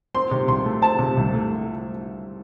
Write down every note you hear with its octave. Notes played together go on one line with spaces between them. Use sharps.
C4 C6
C3
C2 C6
A3
C4 A5
C3
C2
A3